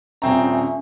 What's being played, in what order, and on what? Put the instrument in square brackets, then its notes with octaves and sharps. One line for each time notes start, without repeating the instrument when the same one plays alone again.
[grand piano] D#1 C4 A#5 [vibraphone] C#4 E5 G#5